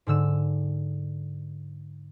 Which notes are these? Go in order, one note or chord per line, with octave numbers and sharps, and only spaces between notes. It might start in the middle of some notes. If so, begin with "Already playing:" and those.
G#2 D3 E6 E7